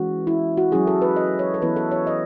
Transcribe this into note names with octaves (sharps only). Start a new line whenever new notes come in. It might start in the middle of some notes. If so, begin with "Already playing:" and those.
Already playing: E3 G#3 C#4 F#4
E4
F#4
F#3 C#4 E4 G#4
A4
B4
D#5
C#5
A4
E3 B3 E4 B4
A4
C#5
D#5